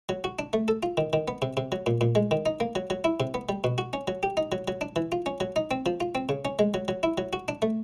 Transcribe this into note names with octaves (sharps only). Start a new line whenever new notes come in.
F#3
F#4
D4
A3
A4
F4
D#3
D#3
B3
C3
C3
F#3
A#2
A#2
G#3
D#3
D#4
A#3
F#3
F#3
E4
C3
B3
G3
B2
F#4
C#4
F#3
G4
D#4
F#3
F#3
D4
E3
F4
C#4
F#3
D#4
C4
F3
F4
C4
C#3
C#4
G#3
F#3
F#3
E4
F#3
F#4
D4
A3